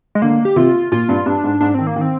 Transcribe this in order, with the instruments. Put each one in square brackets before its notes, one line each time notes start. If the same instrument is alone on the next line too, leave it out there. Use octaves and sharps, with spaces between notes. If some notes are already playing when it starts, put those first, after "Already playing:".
[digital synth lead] G#3
[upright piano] D3 [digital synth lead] A#3
[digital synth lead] G4
[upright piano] C3 [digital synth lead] F4
[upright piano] A#2 [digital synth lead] F4
[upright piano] G2
[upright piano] G2 [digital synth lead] D4
[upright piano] G#2
[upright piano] G#2 [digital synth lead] D4
[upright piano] D#3 [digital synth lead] C4
[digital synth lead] A#3
[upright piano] D#3
[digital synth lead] C4